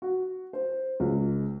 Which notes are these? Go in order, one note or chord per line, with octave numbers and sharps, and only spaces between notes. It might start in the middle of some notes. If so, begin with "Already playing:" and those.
F#4
C5
C#2